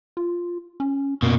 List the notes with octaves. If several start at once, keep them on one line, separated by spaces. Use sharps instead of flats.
F4
C#4
F#2 B2 A#3